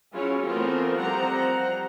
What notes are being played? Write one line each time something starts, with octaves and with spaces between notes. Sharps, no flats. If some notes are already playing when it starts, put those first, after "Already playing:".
F#3 C#4 E4 F4 G#4 C#5
E3 A3 B3 C4 F4 A#4
F3 G3 C4 C5 F#5 A#5